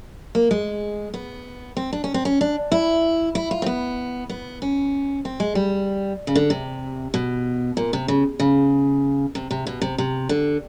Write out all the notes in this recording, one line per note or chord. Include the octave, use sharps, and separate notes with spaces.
A#3
G#3
B3
C4
D4
C#4
C4
C#4
D4
E4
E4
F4
C4
B3
B3
C#4
C4
G#3
G3
C#3
D3
C3
B2
A#2
C3
C#3
C#3
C3
C3
B2
C3
C3
D3